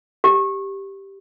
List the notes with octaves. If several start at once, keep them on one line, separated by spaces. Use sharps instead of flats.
G4